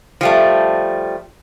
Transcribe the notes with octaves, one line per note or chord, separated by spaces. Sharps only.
F3 G3 A3